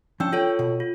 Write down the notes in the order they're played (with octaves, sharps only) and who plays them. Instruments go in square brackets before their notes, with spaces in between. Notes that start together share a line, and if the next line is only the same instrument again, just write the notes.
[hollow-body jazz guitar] F3 C#4 D4 [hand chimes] G5 E6 G6
[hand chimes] F4 A4 C#5 [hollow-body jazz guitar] G5
[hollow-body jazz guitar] B2
[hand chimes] F4